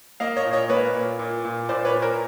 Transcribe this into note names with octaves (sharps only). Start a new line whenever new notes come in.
A#3 D#5 F5
C#5 D#5
A#2
C#5 D#5
A#3 B4 C#5
A#2
A#2
A#2
A#2 C5 D5
B4 C#5
A#2
A#4 C5